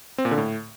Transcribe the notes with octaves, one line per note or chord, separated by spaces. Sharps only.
C4
A#2
D3
A2